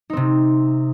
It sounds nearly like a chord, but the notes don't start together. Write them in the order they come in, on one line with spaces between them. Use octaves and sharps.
D#4 C4 C3